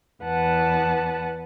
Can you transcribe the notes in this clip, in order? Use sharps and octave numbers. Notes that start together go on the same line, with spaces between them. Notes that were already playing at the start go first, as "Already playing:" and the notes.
E2 B4 F#5 A5